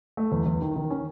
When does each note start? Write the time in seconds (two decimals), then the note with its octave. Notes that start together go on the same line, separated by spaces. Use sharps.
0.17 A3
0.32 E2
0.46 E2
0.62 D#3
0.76 D#3
0.90 C#4